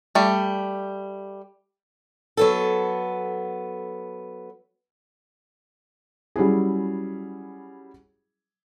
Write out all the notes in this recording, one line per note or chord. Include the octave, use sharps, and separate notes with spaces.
G3 A3
F#3 B3 A4
F#3 G3 C#4 E4 G#4